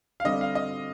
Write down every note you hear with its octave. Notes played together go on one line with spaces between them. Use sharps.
F5
D3 G3 C4 D#5
F5
D#5